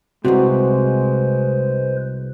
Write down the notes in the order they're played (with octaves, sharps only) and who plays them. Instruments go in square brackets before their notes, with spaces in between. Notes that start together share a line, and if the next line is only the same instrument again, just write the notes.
[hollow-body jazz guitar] C2 F2 C3 [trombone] G#3 [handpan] F#4 [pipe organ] B4 C5